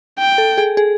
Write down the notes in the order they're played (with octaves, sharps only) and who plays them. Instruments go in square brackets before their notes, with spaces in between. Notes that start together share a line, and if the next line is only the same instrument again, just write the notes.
[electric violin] G5
[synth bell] A4
G#4
G#4